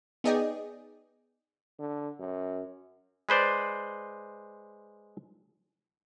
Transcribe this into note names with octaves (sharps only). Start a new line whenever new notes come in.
B3 D#4 G#4 D5 D#5 G5
D3
F#2
G#3 B4 C5 D5